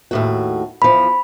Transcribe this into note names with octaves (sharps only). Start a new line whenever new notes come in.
D#2 A2 F#4
E2 F3 B5